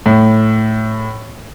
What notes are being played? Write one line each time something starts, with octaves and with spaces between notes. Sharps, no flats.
A2